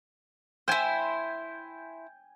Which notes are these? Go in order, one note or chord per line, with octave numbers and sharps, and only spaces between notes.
E4 C5 G5 G#5